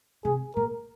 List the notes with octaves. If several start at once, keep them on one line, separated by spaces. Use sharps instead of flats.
C3 G#4
A#2 A#4